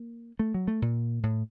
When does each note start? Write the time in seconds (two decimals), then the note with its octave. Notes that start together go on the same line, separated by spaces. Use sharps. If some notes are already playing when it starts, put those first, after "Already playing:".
Already playing: A#3
0.39 A3
0.54 F#3
0.68 A3
0.82 A#2
1.23 A2